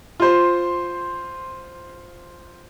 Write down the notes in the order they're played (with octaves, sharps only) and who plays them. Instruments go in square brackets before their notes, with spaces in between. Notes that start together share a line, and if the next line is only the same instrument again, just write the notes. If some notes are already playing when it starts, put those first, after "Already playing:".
[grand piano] F4 C5